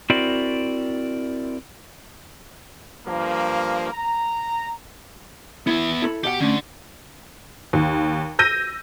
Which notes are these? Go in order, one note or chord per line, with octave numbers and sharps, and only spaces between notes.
C4 E4 F#4 A#4 D5
G2 F3 A#3
A#5
B3 E4 E5
E4 A4 B5
B2 G4 D5 F#5
D3 A3 C#4
D#2
E6 G6 A#6 D#7